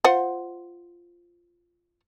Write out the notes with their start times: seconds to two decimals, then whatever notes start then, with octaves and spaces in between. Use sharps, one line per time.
0.04 F4 C5 F#5